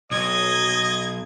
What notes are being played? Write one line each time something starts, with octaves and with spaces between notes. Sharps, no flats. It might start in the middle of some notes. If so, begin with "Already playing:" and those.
B1 D#5 D#6 G#6